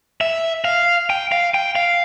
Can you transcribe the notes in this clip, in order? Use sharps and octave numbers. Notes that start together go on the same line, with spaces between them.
E5
F5
G5
F5
G5
F5